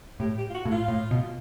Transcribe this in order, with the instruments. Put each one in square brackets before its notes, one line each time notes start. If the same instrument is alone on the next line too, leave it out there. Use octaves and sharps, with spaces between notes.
[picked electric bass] A2 [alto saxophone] G4
[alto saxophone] G4
F4
F#4
[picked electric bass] A2
[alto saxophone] F4
[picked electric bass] A2
B2